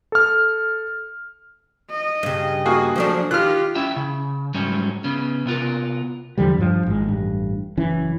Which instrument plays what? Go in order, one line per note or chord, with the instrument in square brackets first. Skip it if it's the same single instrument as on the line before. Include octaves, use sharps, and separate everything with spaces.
[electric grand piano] A4 F6
[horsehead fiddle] D#5
[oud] G2 C#3
[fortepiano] A#3 F#4 G#4
[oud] F3 A3 D4 [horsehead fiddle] F#3
[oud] D#3 [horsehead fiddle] F4 G4 [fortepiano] F6 F#6
[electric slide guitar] C#4 E4 E5 G5
C#3
G#2 F#3 G3 A3 C#4
C#3 B3 C#4
C3 B3 F4 A#4
[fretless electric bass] E2 D3 F3 G3
G2 F3
G#1 G#3
A1 G2
F#1 E3 C#4